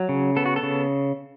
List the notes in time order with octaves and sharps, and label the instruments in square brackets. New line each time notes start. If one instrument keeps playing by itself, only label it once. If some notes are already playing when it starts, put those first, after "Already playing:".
Already playing: [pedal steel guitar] F#3
C#3
B3 A4
F#4
A4
C#3